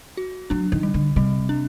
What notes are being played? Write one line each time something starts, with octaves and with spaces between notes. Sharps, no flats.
F#4
F#3 D4
D#3
G3
D3
C3 G3
D4